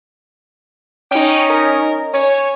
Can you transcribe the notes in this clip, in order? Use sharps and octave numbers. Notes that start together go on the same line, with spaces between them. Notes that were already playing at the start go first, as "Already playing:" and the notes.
C#4 D#4 G5
A#4
C#4 C#5